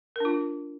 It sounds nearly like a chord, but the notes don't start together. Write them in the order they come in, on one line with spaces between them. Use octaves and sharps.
A#4 D4 F4